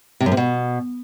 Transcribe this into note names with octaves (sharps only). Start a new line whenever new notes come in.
C3
F#2
C3
B2